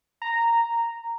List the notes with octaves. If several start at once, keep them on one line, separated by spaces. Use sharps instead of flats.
A#5